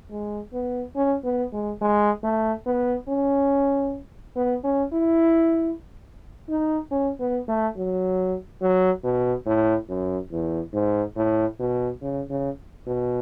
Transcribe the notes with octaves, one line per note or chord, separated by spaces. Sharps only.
G#3
B3
C#4
B3
G#3
G#3
A3
B3
C#4
B3
C#4
E4
D#4
C#4
B3
A3
F#3
F#3
B2
A2
F#2
E2
G#2
A2
B2
C#3
C#3
B2